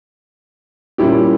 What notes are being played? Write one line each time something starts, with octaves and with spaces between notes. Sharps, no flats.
A#2 G3 C#4 E4 G4